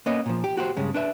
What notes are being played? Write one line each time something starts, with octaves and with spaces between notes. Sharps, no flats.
A#3 B3 C#4 D#5
A#2 F3
G4
F#4 G4 C5
G2 C#3 G#3
D4 B4 E5